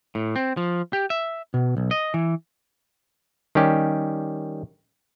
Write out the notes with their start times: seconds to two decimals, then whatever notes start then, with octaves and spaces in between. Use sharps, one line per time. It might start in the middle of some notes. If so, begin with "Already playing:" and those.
0.15 A2
0.36 C4
0.57 F3
0.93 G4
1.10 E5
1.54 B2
1.77 B1
1.91 D#5
2.14 E3
3.55 D#3 G3 C#4 G4